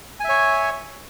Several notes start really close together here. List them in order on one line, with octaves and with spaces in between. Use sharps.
G#5 E5 C#5